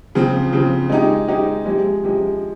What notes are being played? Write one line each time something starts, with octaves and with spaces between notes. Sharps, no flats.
C#3 F3 C4
C#3 F3 C4
G#3 D#4 G4
G#3 D#4 G4
C3 F3 G#3
C3 F3 G#3